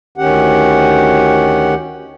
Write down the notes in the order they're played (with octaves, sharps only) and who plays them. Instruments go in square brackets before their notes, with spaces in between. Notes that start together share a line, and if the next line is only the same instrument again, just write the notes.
[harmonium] D2 D#3 C#4 G4 F#5